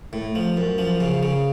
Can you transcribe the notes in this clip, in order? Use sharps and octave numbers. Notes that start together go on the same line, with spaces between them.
A2
F3
F#2
F3
C#3
C#3